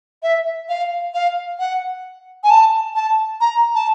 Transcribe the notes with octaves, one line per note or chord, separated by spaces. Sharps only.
E5
F5
F5
F#5
G#5
A5
A5
A#5
A5